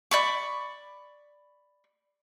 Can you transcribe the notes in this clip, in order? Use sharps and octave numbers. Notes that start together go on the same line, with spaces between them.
D5 B5 C#6